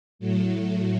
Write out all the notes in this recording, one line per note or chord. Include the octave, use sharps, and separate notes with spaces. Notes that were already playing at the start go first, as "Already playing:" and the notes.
A2 F#3 A3